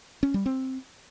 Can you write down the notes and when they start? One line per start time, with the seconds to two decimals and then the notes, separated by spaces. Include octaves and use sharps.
0.23 C#4
0.34 G3
0.46 C4